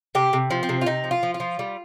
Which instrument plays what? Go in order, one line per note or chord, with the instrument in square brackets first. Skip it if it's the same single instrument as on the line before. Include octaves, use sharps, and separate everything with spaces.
[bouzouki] C3 G4
C3
F3
C4
C3
F4
C3 D#4
F3
F4
F3
F4
F3
G3